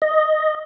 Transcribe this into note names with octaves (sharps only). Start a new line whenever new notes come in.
D#5